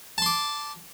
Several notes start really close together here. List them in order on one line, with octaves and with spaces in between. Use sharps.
A5 C6 D6